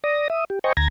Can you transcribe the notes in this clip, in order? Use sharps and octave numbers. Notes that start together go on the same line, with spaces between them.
D5 D#6 A#6
E5 D#6
G4
C5 D#5 G5 G#5 A#5 C#6
D2 A#5 G#6 A#6